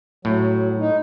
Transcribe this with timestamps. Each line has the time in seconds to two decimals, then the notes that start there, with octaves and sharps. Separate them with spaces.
0.25 A2 F#3
0.80 D#4